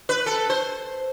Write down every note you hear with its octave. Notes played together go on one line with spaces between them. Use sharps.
B4
A4
C5